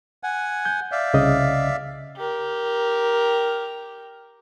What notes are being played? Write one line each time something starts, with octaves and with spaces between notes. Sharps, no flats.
F#5 G#5
G6
D5 E5 F5
C2 C#3 D#5
G4 A#4